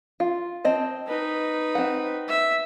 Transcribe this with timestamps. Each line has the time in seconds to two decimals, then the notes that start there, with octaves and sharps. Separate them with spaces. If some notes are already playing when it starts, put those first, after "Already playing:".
0.20 F4
0.65 C4 D#5 A5
1.07 D#4 B4
1.75 C4 F#5
2.28 E5